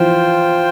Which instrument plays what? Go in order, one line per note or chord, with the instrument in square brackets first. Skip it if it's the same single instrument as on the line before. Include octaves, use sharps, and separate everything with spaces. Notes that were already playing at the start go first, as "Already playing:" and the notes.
Already playing: [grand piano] E3 F3 [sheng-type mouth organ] F4 C5 G5